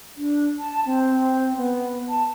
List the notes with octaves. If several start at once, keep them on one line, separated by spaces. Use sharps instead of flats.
D4
A5
C4
B3
A5